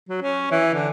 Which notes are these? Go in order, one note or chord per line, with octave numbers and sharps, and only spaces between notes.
F#3
C#4
E3
D3